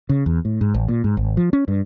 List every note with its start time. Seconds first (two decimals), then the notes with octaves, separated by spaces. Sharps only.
0.09 C#3
0.26 E2
0.45 A2
0.61 G#2
0.74 A1
0.88 A#2
1.04 G#2
1.17 G#1
1.37 F3
1.53 C#4
1.68 G2